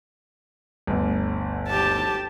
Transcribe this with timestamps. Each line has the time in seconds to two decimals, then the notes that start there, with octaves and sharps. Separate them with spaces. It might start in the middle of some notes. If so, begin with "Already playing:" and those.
0.87 G1 D2
1.68 G4 A5